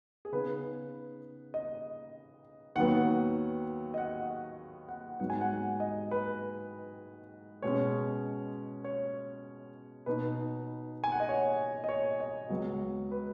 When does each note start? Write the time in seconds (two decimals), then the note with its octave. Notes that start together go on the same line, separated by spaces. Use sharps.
0.25 G#4
0.32 C#3 B3 D#4 B4
1.54 D#5
2.75 D#2 D#3 F#3 B3 F#5
3.94 D#5
3.98 F#5
4.89 F#5
5.20 G#2 F#3 B3 D#4 F#5
5.30 G#5
5.41 F#5
5.80 D#5
6.11 B4
7.62 B2 G#3 C#4 C#5
8.84 C#5
10.06 B2 B3 D#4 B4
11.04 G#5
11.12 F#5
11.20 D#5
11.29 C#5
11.84 D#5
11.89 C#5
12.20 D#5
12.50 C#2 C#3 F#3 B3
13.11 B4